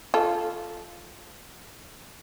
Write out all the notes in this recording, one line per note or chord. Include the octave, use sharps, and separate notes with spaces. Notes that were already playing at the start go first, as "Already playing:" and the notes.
F4 A4